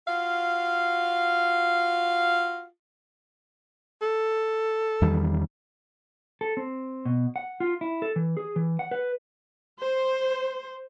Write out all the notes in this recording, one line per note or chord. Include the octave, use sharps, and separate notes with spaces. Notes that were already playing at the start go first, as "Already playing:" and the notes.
F4 F#4 F5
A4
E2 D#3 G3
A4
C4
B2
F#5
F4
E4
A4
E3
G#4
E3
F#5
B4
C5